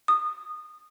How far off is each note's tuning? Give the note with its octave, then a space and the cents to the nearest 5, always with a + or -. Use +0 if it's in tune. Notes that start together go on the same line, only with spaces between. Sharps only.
D#6 -20